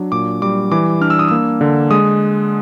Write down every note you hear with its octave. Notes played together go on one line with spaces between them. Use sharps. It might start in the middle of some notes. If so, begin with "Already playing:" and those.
Already playing: F#3 D4
A#2 D6
G3 D6
E3 D6
D4 F6
E6
D#6
A#3 E6
D3
G#3 D#6